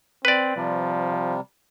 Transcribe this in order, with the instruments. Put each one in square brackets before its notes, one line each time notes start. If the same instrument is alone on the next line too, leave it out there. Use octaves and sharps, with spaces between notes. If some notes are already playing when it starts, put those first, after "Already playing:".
[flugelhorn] C4 [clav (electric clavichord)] B4 D5
[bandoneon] C3 G3 [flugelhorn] F3